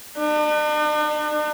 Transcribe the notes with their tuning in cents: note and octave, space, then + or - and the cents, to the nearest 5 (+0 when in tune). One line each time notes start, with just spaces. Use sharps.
D4 +45